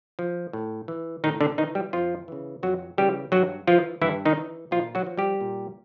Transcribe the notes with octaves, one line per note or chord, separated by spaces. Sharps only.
F3
A2
E3
A2 D#3 D#4
D3 D4
D#3 E3 D#4
G3 G4
F2 F3 F4
C#3 E3
F2 F#3 F#4
C#3 E3 G3 G4
G2 F#3 F#4
E3 F3 F4
G2 E3 E4
D#3 D#4
E3
A#2 F3 F4
F#3 F#4
F3
G3 G4
A#2